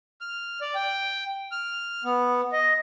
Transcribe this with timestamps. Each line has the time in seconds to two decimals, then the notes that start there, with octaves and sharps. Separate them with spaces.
0.21 F6
0.61 D5
0.75 G5
1.52 F6
2.04 B3
2.53 D#5